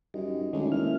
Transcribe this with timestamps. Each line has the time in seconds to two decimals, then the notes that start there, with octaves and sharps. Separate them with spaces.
0.14 F#2 G3 D#4
0.53 D2 D#3 G#3 C#4 D#4
0.72 G#1 A#3 E4 F6